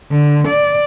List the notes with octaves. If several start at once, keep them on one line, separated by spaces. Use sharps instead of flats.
D3
D5